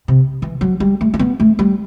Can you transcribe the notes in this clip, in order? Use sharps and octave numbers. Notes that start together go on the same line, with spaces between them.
C3
E3
F#3
G3
A3
A3
B3
A3
G3